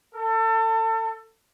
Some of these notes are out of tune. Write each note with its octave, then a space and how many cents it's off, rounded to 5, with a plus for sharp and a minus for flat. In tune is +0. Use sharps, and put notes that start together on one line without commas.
A4 +30